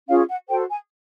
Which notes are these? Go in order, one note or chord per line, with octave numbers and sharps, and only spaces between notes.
C#4 F4 G#4 C#5 F5
F#5
F#4 A4 C5 G5
G#5